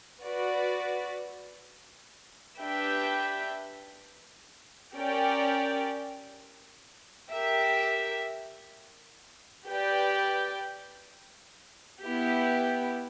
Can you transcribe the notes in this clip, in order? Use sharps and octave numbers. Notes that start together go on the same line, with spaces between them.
F#4 B4 D5
D4 G4 B4 E5 G5
C#4 G4 A#4 D5 G5
G4 A#4 E5
G4 B4 D5 G5
B3 E4 G4